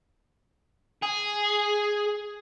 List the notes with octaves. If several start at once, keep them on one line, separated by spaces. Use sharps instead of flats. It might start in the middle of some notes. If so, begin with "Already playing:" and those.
G#4